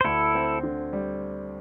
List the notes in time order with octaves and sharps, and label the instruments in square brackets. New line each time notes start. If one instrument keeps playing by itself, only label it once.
[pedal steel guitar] C5
[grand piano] D2 [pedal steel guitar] E4 A4
[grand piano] C4
D3
G3